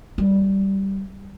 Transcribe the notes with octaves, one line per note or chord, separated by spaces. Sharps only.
G3